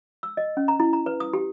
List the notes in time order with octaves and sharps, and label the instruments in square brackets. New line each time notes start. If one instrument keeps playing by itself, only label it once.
[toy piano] E6
D#5
C#4
A#5
E4
A#5
B4
D#6
G4